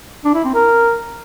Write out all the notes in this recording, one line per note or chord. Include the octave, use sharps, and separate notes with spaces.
D4
E4
C4
A#4